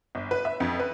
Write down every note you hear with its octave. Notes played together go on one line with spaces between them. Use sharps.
G1
B4
E5
F2
B4